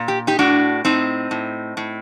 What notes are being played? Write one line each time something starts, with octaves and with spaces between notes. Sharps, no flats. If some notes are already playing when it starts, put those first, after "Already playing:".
Already playing: A#2
G4
D#4 G4
A2 D4 F#4
A2 C4 D#4
A2
A2